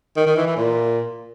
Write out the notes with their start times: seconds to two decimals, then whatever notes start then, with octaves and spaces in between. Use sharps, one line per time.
0.16 D#3
0.26 D#3
0.37 E3
0.47 E3
0.57 A#2